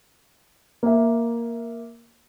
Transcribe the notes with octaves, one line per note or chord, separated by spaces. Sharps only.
A#3 E5